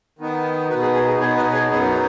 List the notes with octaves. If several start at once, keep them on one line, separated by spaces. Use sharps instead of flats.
D#3 B3 D#4
B2 B3 D#4 F#4 B4
G#4
G#4
G#4
B2 B3 D#4 G#4 C#5
B4 D#5
G#4 C#5
F#2 F#3 B3 D#4 G#4